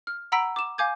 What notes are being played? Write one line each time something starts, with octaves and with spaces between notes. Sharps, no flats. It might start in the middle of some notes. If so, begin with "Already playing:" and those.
F6
F#5 A#5 B5 E6 B6 D7
D6 E7
F5 G#5 D6 G6 G#6